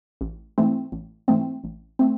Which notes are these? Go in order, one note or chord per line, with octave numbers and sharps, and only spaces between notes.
A1
G#2 E3 A3 C4
A1
G#2 E3 A3 C4
A1
A3 C4